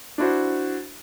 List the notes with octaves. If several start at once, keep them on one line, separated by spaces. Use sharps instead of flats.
D4 E4 F#4 C5